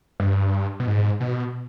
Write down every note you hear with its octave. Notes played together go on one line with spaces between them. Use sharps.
G2
B2
G#2
B2